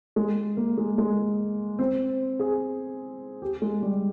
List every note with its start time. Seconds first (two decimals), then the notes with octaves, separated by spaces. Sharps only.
0.16 G#3
0.57 A#3
0.78 G#3
0.98 G#3
1.79 C4
2.40 G#4
3.42 G4
3.62 G#3
3.83 G3